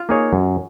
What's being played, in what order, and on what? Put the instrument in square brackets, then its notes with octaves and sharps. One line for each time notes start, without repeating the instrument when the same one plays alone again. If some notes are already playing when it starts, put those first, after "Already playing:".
Already playing: [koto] F4
[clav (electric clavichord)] A#3 D#4 G#4 C#5
F#2